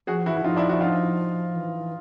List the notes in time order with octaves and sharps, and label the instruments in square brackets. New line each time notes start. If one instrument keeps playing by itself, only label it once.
[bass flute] F3 [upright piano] F#4 G#4
[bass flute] E3 [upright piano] E4 F#4
[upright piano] E4
[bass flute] F3 [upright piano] D#4 F4
[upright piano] D4 E4
E4 F#4
D#4 F4
[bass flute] E3